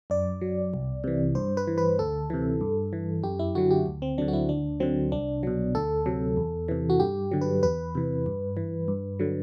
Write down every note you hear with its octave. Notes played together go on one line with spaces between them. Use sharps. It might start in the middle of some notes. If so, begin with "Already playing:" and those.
F#2 D5
F#3
C2
C3 E3
G2 C5
B4
E3
B4
D2 A4
C3 E3
G2
E3
F#2 G4
E4
D3 F#3 F#4
G4
D2
C4
D3 F#3 D4
F#4
E4
D2 D4
D3 F#3 C4
C2 D4
B2 F#3
D2 A4
C3 F#3
E2
C3 E3
F#4
G2 G4
D3 F#3
B4
E2 B4
C3 E3
G2
E3
G2
D3 F#3